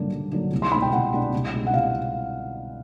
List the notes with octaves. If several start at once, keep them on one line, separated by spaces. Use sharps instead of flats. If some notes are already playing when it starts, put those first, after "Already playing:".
Already playing: G2 D3 F#3 A#3 D4
G2
D3 F#3 A#3 D4
C2
C6
B2 G#3 B3 D4 B5
G5
C2 F#5
B2 G#3 B3 D4
C2
B2 G#3
F#5
C2 F5